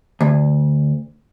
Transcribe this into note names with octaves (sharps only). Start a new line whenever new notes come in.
D2